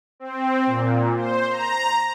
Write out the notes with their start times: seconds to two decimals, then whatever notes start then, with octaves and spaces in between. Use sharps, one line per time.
0.20 C4
0.66 A#2
1.16 C5
1.49 A#5